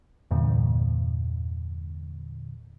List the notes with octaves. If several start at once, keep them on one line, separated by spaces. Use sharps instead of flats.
E2 G2 A#2 D3